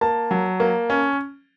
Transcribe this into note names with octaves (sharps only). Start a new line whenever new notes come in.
A#3 A5
F#3
A#3
C#4